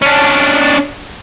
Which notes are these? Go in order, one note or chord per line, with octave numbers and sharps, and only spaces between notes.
C#4 D4